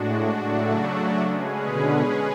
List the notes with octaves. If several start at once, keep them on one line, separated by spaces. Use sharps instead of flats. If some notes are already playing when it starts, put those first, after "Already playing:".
Already playing: A2 G#3 D4 F#4
A2 C#3 F#3 A3 D4 F#4
G#3 C#4 G#4 B4
B2 D3